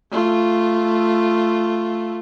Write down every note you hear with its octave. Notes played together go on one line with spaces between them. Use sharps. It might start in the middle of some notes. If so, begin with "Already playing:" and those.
A3 F4